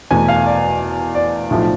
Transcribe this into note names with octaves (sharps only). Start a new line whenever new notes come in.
E2 B2 A3 G#5
F5
D5
D5
B1 A2 F3 A3